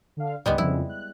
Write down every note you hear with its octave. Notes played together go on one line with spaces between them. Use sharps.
D3 F5
C#2 G#2 G3 G#3 B3
F2 C#3 E4
F#6